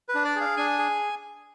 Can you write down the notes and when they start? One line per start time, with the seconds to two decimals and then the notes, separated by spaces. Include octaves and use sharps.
0.09 B4
0.15 D4
0.24 D5
0.36 G#4 F5
0.57 D4 G#5
0.79 G#4